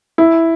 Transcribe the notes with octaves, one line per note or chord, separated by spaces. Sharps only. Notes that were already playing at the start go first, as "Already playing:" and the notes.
E4